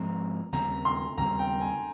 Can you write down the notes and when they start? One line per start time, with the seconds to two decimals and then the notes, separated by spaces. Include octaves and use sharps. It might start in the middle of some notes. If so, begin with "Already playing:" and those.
Already playing: G#2 F3 G#3 C4 A#5
0.53 D#2 C#3 G3 C4 A#5
0.85 C6
1.17 D#2 C#3 G3 C4 A#5
1.39 G5
1.61 G#5